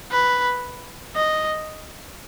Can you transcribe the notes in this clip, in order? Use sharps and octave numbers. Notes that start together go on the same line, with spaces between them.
B4
D#5